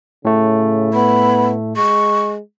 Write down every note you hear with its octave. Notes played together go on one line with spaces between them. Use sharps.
A2 C#3 A3
B3 B5
G#3 C#6